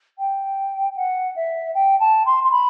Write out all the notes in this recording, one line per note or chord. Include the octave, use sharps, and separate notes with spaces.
G5
F#5
E5
G5
A5
C6
C6
B5